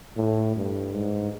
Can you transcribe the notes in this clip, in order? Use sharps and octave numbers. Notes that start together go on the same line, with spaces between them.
A2
G2
G#2